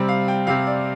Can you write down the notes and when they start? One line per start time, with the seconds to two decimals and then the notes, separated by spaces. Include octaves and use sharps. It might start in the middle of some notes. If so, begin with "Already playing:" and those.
Already playing: C3 G3 C4
0.09 F5
0.28 G5
0.47 C3 G3 C4 F5
0.67 D5